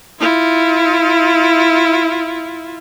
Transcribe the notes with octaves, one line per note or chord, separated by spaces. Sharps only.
E4 F4